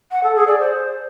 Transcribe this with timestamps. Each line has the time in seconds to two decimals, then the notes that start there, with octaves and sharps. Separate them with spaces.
0.12 F#5
0.24 A4
0.35 G#4
0.47 D5
0.59 C5